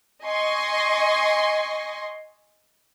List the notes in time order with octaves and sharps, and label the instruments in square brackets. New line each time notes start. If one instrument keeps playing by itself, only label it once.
[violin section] D#5 G#5 C6 C#6